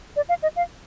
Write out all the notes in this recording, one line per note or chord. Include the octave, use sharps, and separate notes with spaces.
D5
F5
D#5
F5